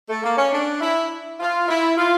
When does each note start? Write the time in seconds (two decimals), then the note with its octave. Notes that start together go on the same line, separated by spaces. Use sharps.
0.09 A3
0.23 A#3
0.37 C#4
0.52 D4
0.81 E4
1.40 F4
1.69 E4
1.97 F4